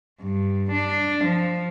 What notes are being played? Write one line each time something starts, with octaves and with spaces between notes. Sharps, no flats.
G2
D4
F3